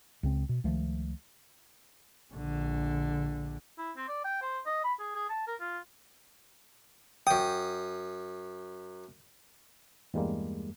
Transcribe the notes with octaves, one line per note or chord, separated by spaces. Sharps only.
C#2 C#3 C4
B2
C#2 D#3 F3 A3
A#1 D3
E4
C4
D5
G5
C5
D#5
B5
G#4
G#4
A5
A#4
F4
F#2 G5 D#6
E2 G2 G3 G#3 A#3